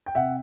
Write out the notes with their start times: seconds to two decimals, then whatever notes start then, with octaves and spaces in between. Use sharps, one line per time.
0.06 G5
0.15 C3 E5 F#5